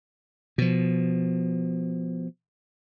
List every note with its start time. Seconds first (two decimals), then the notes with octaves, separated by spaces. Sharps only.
0.58 B2 F3